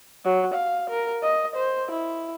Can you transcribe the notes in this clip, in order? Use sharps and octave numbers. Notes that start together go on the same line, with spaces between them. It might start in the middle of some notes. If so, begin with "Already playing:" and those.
F#3
F5
A#4
D#5
C5
E4